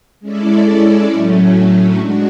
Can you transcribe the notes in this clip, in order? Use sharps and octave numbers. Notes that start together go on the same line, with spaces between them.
G#3 C#4 E4 A4 D5
A2 F#3 A3 C#4
G#3 D4 F#4